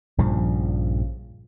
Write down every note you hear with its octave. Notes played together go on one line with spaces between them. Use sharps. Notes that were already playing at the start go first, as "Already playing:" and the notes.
A#1 G2 C#3 F3